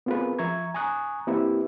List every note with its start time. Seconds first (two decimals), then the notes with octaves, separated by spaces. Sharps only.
0.06 B3 C4 F4 G#4 A#4 B4
0.39 F3 E5 A#5 C#6 G#6
0.74 G#5 A#5 C#6 D#6 F#6
1.27 A#3 C4 E4 G4 B4 E5